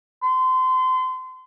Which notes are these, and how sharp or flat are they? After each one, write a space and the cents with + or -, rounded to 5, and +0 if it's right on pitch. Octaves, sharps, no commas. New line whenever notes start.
C6 -30